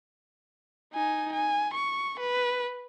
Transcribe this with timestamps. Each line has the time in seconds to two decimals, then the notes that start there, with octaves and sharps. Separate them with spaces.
0.93 D#4 G#5
1.33 G#5
1.74 C#6
2.20 B4